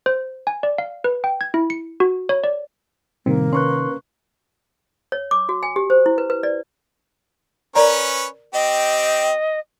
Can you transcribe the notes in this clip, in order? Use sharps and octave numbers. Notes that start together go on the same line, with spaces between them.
C5
G#5
D5
F5
B4
G5
G#6
E4
C#7
F#4
C#5
D5
A2 C3 D#3 G3 A#3 C4
C#4 B4 C6 C#6 F#6
C#5
D6
F#4
G#5
G4
C5
E4
B4
B4
D5
C#4 A#4 B4 C#5 D5 A#5
C4 G4 D#5